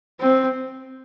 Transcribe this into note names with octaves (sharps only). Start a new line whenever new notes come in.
C4